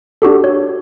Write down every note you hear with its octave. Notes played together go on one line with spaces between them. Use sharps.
D4 F#4 G4 A4
C#5